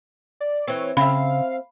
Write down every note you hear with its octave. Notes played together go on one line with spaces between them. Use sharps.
D5
E3 C4 C#5
C#3 C4 E5 F5 B5